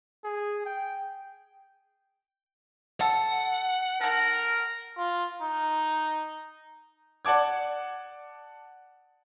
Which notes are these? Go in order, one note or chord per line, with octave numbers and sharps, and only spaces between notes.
G#4
G5
A4 F#5
D#3 A4 A#4
F4
D#4
D5 F#5 A5 D6 G#6